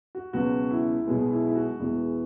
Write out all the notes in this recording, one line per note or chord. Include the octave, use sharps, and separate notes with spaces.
F#4
C#2 B2 F#3 B3 F#4
E4
B1 B2 G#3 B3
E4
E4
F#4
E1 E2 E3 G#3 B3